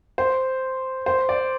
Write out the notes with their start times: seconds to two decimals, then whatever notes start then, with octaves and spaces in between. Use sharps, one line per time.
0.18 C5
1.06 C5
1.29 D5